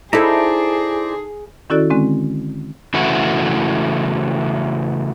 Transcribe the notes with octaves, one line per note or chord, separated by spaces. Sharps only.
D#4 E4 G#4 A4 C5 D5 A#5
D#3 C#4 E4 F#4 A4 D5
D3 G#3 C4 C#4
C#3 E3 A3 E4 F#4